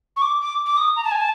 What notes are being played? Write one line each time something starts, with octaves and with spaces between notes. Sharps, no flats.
C#6
D6
D6
D6
D#6
A#5
A5
G#5
A5